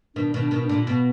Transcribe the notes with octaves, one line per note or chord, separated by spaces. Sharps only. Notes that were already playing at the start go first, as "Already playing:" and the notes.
B2 D#3 D4
B2 D#3
D4
B2 D#3
D4
A#2 D3
B2 B3